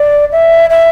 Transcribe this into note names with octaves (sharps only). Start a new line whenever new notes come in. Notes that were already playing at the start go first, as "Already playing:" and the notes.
Already playing: D5
E5
E5